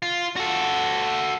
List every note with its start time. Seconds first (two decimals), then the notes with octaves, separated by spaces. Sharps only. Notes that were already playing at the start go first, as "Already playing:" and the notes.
0.02 F4
0.36 F#4 A4